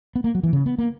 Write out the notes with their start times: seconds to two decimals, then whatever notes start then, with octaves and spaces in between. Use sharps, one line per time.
0.16 B3
0.24 A#3
0.35 F#3
0.43 E3
0.53 C#3
0.66 B3
0.79 A#3